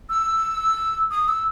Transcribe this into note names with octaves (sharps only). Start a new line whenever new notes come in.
E6
D#6
E6